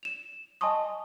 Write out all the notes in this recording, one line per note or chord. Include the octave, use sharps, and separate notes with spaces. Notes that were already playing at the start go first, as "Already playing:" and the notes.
E7 F7
D#5 G#5 A5 C6 C#6 D#6